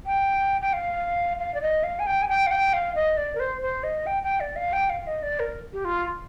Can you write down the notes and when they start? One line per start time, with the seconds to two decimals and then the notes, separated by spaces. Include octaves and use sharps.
0.06 G5
0.61 G5
0.73 F5
1.39 F5
1.54 D5
1.62 D#5
1.83 F5
1.99 G#5
2.06 G5
2.22 G#5
2.28 G5
2.46 F5
2.51 G5
2.73 F5
2.95 D#5
3.17 D5
3.35 A#4
3.40 C5
3.61 C5
3.83 D#5
4.06 G5
4.23 G5
4.40 D5
4.56 F5
4.73 G5
4.90 F5
5.07 D#5
5.23 D5
5.39 A#4
5.73 G4
5.85 F4